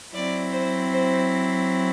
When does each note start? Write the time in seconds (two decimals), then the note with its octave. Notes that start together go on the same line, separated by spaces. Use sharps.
0.14 F#3 C4 E4 D5
0.52 C5
0.91 C5